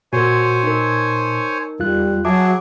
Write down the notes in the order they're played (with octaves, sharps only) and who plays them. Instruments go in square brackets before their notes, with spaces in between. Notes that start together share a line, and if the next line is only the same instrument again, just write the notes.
[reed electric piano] A#2 [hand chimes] F#4 A#4 [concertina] C5 C#5 G#5
[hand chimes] D#4 A#4
[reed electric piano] E2 F4 F#6 [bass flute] G3
[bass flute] F#3 [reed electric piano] F#4 E5 A5 [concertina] G#4 [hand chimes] D6